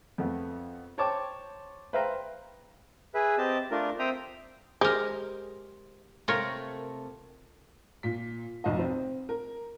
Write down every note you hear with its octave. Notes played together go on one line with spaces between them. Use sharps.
F2 A3 B3
C5 C#5 G5 A5 C#6 D6
B4 C5 E5 F5 G5 A#5
G#4 B4 E5
C4 G4 D#5 A5
A3 D4 F4 A#4
C4 C5 E5 G5 A#5 D#6
G#3 G4 A#4 C5
C3 A3 F4 A#4 C#5
A#2 B6
F1 B1 D#5
C4
A#4